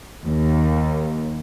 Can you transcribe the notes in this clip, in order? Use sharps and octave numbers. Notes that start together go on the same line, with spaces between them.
D#2